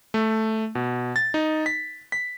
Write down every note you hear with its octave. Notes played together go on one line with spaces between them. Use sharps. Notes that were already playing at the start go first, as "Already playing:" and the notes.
A3
B2
A6
D#4
B6
B6